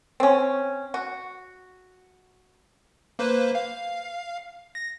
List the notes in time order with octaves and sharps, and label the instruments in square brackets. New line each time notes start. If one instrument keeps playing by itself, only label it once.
[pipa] C4 C#4
F#4
[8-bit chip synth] A#3 B4 C5
F5
A#6